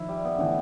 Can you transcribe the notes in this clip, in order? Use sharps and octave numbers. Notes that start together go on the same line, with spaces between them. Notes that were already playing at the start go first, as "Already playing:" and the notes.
Already playing: D#3 F3 E4
G3
B3
A2 D3 E3